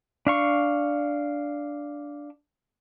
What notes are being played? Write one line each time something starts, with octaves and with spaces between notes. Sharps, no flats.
D4 F5 C#6